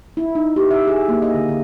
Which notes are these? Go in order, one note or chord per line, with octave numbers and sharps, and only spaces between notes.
E4
D#4
G4
E5
G#4
A#3
D#5
D3
D3